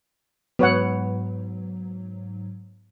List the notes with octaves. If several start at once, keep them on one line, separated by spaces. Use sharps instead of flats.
G#2 F#3 B3 C#5 F#5